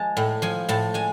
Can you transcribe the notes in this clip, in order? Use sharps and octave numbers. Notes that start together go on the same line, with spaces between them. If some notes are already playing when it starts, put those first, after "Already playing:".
Already playing: F3 G#3 A5
A2
F3 G#5
A2 A5
G#3 G#5